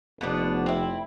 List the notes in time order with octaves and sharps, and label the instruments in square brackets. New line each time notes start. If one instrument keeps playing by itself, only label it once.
[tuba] F1 [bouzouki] B2 B3 D4
[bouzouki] C4 E4